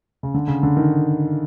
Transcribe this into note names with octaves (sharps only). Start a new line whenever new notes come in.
C#3
D3
C#3
D3
D#3